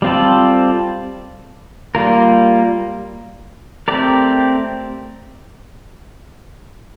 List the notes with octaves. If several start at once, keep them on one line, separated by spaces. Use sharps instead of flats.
G3 C4 F4 A4 D5
G3 A#3 F4 A#4
A3 C4 G4 A#4 D5